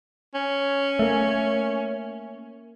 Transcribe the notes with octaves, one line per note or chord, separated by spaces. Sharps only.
C#4
A3 A#3